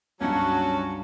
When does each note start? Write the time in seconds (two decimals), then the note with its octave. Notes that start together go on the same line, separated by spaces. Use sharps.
0.21 C#2 G2 F#3 C#4 F#4 A5